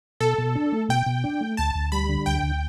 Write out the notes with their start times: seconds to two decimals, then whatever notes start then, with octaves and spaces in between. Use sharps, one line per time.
0.20 B2 A4
0.38 B2
0.55 D4
0.72 A3
0.89 B2 G5
1.06 B2
1.24 D4
1.41 A3
1.57 D2 A5
1.75 D2
1.92 G3 B5
2.09 D3
2.26 D2 G5
2.43 D2